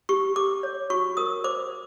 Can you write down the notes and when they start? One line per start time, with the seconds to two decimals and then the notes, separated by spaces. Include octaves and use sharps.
0.09 G4 C#6
0.36 A4 D6
0.63 C#5
0.90 F#4 C#6
1.17 A#4 D#6
1.44 C5 D6